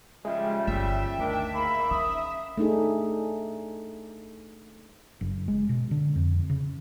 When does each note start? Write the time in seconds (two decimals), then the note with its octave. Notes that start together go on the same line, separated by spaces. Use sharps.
0.25 C#3 F3 G3 G#3 E5
0.67 G1 E5 G5
1.19 D2 D#3 D4
1.54 G#2 A#3 B5
1.91 C#4 D#6
2.58 A3 D4 D#4 G#4
5.21 F#1
5.48 G#3
5.69 B2
5.91 D3
6.16 F2
6.50 C#3